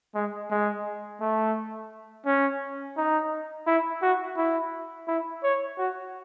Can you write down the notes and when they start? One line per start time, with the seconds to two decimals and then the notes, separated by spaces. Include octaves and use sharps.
0.15 G#3
0.50 G#3
1.21 A3
2.26 C#4
2.97 D#4
3.67 E4
4.02 F#4
4.37 E4
5.08 E4
5.44 C#5
5.78 F#4